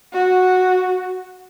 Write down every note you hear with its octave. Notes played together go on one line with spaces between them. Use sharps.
F#4